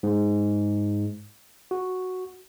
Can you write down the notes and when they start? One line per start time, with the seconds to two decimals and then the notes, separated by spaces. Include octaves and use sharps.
0.03 G#2
1.71 F#4